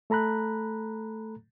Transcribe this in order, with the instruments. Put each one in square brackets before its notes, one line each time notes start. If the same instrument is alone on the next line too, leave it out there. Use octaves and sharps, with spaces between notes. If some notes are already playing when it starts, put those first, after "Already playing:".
[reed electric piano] A3 A4 A#5 B5 F#6